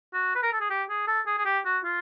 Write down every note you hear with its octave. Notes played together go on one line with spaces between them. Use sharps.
F#4
B4
A#4
A4
G#4
G4
G#4
A4
G#4
G#4
G4
F#4
F4